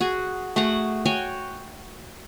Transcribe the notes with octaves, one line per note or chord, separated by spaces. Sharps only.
F#4 G#4
A3 F#4 G#4 F#5
F#4 C#5 G5 G#5